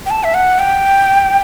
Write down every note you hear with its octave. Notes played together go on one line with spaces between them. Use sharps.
G5
A5
E5
F#5
G5